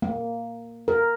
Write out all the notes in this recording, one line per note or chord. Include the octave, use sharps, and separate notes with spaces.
A#3
A#4